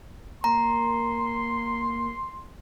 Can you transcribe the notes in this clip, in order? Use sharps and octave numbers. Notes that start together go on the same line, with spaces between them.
A#3 A#5 C6